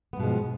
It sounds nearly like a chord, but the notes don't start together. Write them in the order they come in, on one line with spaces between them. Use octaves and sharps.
B3 G2 B2 G#3 F3